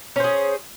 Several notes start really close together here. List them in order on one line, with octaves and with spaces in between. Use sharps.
C#4 C5 G#4